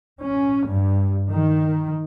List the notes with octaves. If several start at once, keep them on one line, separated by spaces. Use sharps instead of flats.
C#4
G2
D#3